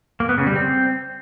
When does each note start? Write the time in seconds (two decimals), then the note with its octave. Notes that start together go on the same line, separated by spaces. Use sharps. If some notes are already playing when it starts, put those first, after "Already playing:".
0.20 A#3
0.29 B3
0.38 C#3
0.47 G3
0.56 C4